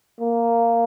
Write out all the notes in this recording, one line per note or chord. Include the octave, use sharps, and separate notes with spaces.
A#3